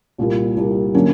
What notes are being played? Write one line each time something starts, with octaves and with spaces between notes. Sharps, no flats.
C2 A#2 G3 A#3
C2 A#2 G3 A#3
D3 F#3 A#3 C#4